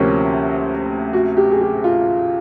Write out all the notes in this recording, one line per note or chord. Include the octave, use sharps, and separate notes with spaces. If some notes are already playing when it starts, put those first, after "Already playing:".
Already playing: D2 C3 F3 A#3 C#4 G4
F#4
G4
G#4
G4
F4